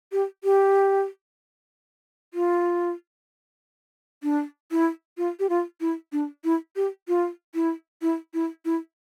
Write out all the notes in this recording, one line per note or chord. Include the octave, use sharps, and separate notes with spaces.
G4
G4
F4
D4
E4
F4
G4
F4
E4
D4
E4
G4
F4
E4
E4
E4
E4